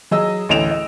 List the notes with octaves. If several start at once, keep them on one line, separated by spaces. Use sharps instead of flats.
F#3 G#4 D#5 E6
A1 D2 D#5 D7 E7 F7
D#5